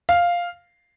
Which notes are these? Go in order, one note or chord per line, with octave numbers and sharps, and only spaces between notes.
F5